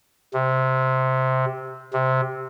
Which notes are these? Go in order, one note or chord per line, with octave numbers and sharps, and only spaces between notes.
C3
C3